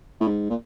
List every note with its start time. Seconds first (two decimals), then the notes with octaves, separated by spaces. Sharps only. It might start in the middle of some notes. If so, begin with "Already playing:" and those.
0.20 A2
0.27 G#2
0.50 A#2